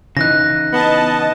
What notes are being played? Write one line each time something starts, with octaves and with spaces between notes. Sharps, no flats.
C#3 E3 D#4 F#6 A#6
B3 D#5 A5